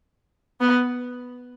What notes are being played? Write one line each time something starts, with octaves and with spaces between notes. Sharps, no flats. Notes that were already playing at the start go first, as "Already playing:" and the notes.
B3